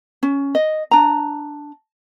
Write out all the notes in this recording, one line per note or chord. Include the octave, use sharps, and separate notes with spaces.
C#4
D#5
D4 A#5